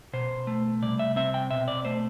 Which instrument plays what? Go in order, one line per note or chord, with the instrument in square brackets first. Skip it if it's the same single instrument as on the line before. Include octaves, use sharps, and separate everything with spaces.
[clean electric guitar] B2 C5
A3
C2 D5
E5
C4 E5
G5
B2 E5
D5
A3 C5